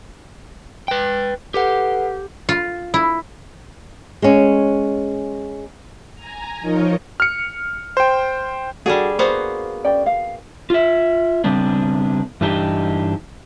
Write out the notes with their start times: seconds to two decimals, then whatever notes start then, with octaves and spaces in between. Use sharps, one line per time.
0.88 B4 G5
1.54 G4 A4 B4 F#5
2.49 F4
2.94 E4
4.22 G#3 C#4
6.15 G#5 A#5
6.61 F3 D#4 F4 A#4 C#5 D#5
7.20 F6 C#7
7.97 C5 G5
8.86 G3 D4 F#4 G#4 A4 F#5
9.19 A#3 B3 F#4 C5
9.84 C#4 D5 G5
10.06 F5
10.70 F4 E5
11.44 C#3 G3 B3 C4 D4
12.41 G2 E3 D4 D#4 G4 D#5